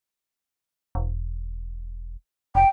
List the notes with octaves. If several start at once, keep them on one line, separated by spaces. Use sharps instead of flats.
E1
F1 G5